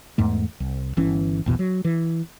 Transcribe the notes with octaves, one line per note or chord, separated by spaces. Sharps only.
E2 G#2 A3
C2
G1 E3 C#4
A#1 E2 B2
F#3
E3